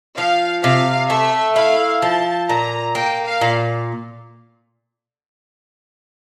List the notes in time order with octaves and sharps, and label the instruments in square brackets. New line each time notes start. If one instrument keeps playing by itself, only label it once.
[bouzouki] F3 [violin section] F5
[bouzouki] C3 [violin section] F5
[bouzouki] A3 [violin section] E5
[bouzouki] E4 [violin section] F5
[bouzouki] F3 [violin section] A5
[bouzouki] A#2 [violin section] A#5
[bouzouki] A#3 [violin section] G5
[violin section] F5
[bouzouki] A#2